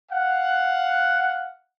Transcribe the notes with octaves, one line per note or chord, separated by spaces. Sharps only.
F5 F#5